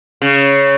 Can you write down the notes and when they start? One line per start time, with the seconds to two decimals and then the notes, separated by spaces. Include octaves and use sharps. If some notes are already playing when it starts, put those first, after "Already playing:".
0.22 C#3